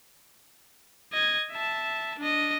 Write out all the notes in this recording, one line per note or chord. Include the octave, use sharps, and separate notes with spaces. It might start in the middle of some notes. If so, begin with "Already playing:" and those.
D#5 G#6
E5 A5
D4 D#5